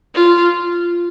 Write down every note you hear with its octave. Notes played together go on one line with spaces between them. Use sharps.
F4